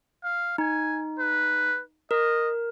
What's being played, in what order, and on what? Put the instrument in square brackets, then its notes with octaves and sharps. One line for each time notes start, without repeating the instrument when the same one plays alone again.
[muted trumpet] F5
[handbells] D#4 [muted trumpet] G#5
[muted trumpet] B4
[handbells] A#4 [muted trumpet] D#5